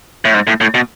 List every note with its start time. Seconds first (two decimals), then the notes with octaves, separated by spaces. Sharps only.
0.25 A2
0.34 G#2
0.47 A2
0.61 A2
0.74 B2